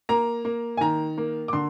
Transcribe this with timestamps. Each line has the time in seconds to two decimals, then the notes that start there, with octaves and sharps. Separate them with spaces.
0.09 A#3 A#5
0.45 A#3
0.77 G#5
0.81 D#3 A#5
1.18 A#3
1.48 D6
1.53 D3 C6